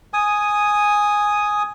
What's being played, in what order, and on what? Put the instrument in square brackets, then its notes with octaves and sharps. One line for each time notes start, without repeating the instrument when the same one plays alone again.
[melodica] G#5 D#6